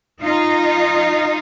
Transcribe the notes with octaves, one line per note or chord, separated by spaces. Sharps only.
D#4 F4